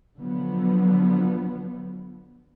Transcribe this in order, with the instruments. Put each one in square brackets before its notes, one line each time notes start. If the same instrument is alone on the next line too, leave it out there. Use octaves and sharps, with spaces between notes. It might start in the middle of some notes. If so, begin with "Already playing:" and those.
[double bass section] D3 F3 F#3 B3